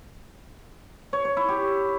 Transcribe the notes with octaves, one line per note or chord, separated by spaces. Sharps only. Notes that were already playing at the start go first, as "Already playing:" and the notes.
C#5
C#5
E4
G4